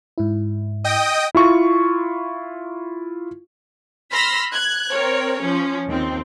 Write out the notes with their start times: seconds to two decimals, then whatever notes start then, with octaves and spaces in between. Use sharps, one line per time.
0.18 G#2 E4
0.84 D#5 G5 D#6
1.35 E4 F4 C#6
4.12 B5 C6 E6 F6 A#6 B6
4.54 F#6 G#6
4.91 C4 A#4 C#5
5.39 F3 C#4
5.87 D#2 C4